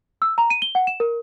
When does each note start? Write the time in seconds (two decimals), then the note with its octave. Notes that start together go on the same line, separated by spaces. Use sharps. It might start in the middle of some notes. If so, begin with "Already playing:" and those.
0.22 E6
0.38 A#5
0.50 D#7
0.62 G7
0.75 F#5
0.87 E7
1.00 A#4